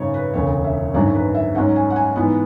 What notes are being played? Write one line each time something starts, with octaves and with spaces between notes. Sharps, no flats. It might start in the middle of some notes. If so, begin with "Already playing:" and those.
Already playing: G#1 F#2 C#3 C#5
B4
E1 D2 C#3 C#5
E5
G#1 F#2 D3 F#3 D5
B4
E5
G#2 F#3 C#4 F#5
G#5
F#5
G#5
G#2 E3 B3